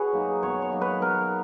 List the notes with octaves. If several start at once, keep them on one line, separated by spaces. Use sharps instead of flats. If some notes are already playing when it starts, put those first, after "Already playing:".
Already playing: F#4 G#4 B4 C#5
F#3 A#3 D#4
B2 C#5
C#5
F#3 A#3 D#4
B4
B2 A#4